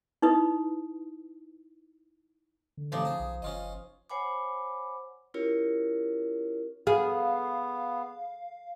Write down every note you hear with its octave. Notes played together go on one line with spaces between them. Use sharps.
D#4 E4 B4 D#6
D3
A1 C3 F3 D4 D#4
G#4 A5
B1
F#1 C#4 F4 D#5
C5 C#5 F#5 G#5 B5 D6
C#4 E4 F4 G4 A#4 C#5
B3 G#4 F5